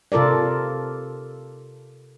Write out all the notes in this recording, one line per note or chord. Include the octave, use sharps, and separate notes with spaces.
C3 F4 A4 A#4 D5